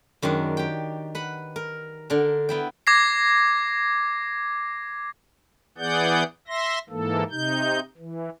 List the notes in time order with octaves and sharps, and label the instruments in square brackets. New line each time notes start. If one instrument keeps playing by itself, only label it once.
[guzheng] F#2 D#3 G#3 D4
G4 G5
B4 F#5 B5
A#4
D3 D4 A#4
B3 E4 G5
[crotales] D6 G#6 A#6 C7
[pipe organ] E3 B3 G#4 D5 F#5 G6
E5 C6 A#6
G#2 E3 A#3 A4
C3 D#4 G6
E3